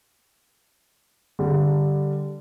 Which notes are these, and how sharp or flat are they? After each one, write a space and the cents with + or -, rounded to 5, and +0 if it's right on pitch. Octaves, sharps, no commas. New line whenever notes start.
D3 +0 G3 +0